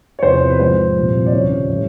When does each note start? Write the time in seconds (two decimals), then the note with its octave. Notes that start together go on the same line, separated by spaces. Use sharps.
0.19 C#5
0.23 E2 C3 F3 C5
0.50 B4
0.60 G#2 F3 C5
0.96 C2 A#2 F3
1.26 D5
1.32 D#2 C#3 F3 C#5
1.69 A2 E3 G3